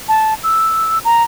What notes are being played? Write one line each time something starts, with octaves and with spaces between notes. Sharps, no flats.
A5
E6
A#5